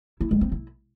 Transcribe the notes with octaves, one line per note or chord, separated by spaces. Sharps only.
E4
G#3
C4
E4